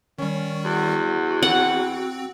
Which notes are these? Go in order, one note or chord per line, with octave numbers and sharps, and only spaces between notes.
D#3 G3 C#4
E2 F#4
C4 F#5